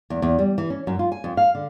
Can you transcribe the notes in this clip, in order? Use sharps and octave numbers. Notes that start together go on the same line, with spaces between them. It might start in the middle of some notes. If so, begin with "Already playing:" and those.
E2
E2
G3
E3
C#4
F#2
F4
G#5
F2
F5
D3